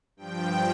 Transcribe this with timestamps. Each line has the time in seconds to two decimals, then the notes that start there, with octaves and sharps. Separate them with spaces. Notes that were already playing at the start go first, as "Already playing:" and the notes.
0.17 G2 F3 G5